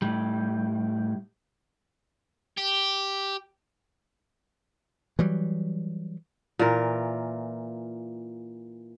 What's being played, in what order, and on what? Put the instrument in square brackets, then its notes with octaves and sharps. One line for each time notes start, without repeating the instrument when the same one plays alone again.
[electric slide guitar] A2 G3
[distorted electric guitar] G4
[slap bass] E3 F#3 G3
[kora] A#2 E3 F4 A#4